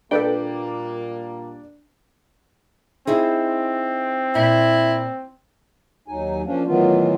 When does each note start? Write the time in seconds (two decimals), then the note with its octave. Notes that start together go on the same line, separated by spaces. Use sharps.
0.11 A#2 G3 A#3 D4 A4 B4 D5 G5
3.07 C4 D#4 E4 G#4
4.35 A#2 E4
6.08 D#2 F#3 D#4 G#5
6.45 F3 A#3 C#4 D4
6.66 A2 D#3 E3 F#3 B3 F4